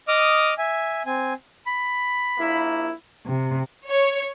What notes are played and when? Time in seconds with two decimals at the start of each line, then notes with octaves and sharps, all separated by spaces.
0.08 D#5 D6 D#6 F6
0.58 E5 G#5
1.06 C4 G#5
1.66 B5
2.38 A#1 A#3 E4
3.27 C3
3.88 C#5